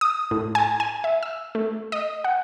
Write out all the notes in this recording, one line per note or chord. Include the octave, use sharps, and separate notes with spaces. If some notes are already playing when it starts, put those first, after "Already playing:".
D#6
A2
G#5
G#5
E5
E6
A3
D#5
F#5